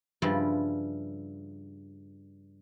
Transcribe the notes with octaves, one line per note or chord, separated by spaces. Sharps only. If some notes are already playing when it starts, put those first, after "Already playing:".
G2 C#3 F3 G3 E4 F4